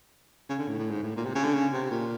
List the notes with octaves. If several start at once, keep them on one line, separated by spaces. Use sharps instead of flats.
C#3
D3
A2
A2
G#2
A2
A#2
C3
C#3
D3
C#3
C3
A#2